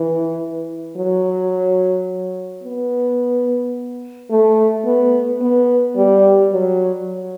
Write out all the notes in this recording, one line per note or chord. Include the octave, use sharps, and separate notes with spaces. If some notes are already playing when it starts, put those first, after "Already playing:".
Already playing: E3
F#3
B3
A3
B3
B3
G3
F#3